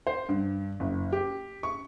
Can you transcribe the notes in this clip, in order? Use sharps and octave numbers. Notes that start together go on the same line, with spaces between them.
C5
G2
F#1
G4
C#6